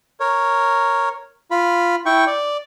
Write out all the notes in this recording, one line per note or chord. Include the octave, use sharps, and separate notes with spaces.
A#4 C#5
F4 B5
E4 G5 C#6
D5